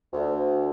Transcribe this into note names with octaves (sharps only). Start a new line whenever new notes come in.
D2